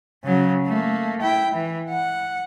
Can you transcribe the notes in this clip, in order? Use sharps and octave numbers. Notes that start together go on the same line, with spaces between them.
C#3 F#3
A3 A#3
E4 G5
E3
F#5